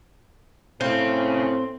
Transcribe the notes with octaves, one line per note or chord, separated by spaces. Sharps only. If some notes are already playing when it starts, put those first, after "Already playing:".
A2 C4 C#4 F5